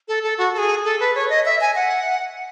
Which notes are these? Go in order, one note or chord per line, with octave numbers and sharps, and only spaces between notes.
A4
A4
F#4
A4
G#4
A4
B4
C#5
D#5
E5
G#5
F#5